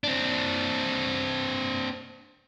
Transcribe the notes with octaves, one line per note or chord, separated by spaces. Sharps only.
C4 D4